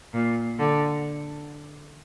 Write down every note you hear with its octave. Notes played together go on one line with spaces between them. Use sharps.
A#2
D3